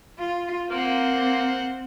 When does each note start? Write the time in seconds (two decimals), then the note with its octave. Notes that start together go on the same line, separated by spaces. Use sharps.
0.19 F4
0.70 A#3 C4 C5 F#5